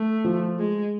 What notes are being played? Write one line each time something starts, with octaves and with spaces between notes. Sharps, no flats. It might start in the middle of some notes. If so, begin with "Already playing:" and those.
Already playing: A3
F3
G#3